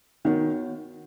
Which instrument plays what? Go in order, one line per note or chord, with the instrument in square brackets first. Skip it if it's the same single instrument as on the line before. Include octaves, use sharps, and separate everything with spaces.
[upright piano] D#3 [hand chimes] B3 F#4 C#5 F#5